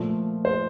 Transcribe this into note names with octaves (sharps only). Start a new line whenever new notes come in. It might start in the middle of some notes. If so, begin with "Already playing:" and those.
Already playing: A#2 F3 A3
C5